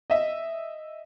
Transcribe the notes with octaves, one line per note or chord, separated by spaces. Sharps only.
D#5 E5